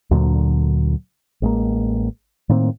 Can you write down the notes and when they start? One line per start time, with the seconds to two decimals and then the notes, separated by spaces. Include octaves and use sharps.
0.11 D2 A#2 D3 F#3
1.42 A1 G#3 A#3
2.49 A2 D#3 A#3 C4